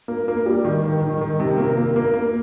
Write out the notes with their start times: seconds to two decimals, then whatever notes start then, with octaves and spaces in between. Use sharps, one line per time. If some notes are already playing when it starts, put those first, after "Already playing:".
0.08 A#3
0.28 A#3
0.46 G3
0.65 D#3
0.84 D#3
1.02 D#3
1.21 D#3
1.40 C3
1.58 A#3
1.77 A#3
1.96 A#3
2.14 A#3